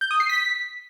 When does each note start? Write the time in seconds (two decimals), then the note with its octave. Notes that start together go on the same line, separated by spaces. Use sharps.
0.01 G6
0.11 D#6
0.20 C7
0.29 B6